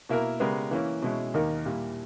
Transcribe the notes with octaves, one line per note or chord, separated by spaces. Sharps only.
B2 A#3 E4 A#4
C#3 G#3 B3 G4 A#4
E3 A#3 C#4 E4
B2 G#3 C#4 E4
D#2 D#3 A#3 D#4 A#4
A#2 G3 A#3 E4